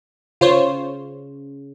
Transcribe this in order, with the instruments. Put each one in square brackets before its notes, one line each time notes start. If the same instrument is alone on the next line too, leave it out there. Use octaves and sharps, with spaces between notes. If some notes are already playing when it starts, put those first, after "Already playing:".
[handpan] C#3 [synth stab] F4 C5 C#5